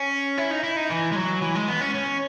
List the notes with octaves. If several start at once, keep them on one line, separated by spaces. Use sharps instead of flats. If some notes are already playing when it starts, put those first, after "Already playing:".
Already playing: C#4
E4
D#4
E4
D#4
E3
G#3
F#3
E3
G#3
B3
C#4
C#4